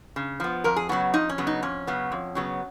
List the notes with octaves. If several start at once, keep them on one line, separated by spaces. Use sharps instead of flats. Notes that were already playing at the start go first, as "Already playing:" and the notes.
C#3
F3 B3
F2 A#4
G#4
C#3 F#3 B3 F#4
F2 D#4
C#4
C#3 F#3 B3
D#4
F2 C#4
C#3 F#3 B3
F2
C#3 F#3 B3